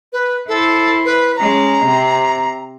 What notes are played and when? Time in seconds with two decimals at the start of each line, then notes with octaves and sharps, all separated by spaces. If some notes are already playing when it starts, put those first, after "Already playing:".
0.13 B4
0.48 E4 A4 C5
1.05 B4
1.37 G#3 C#4 A#5
1.85 C3 C4